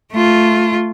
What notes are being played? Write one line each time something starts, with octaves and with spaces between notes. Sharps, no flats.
A3 F4